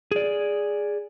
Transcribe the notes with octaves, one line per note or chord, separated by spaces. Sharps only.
G#4 D5